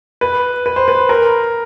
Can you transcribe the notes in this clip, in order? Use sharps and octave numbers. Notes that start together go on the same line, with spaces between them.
B4
B4
C5
B4
A#4